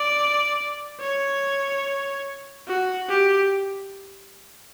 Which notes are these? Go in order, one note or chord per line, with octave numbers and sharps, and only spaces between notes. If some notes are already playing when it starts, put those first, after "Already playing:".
Already playing: D5
C#5
F#4
G4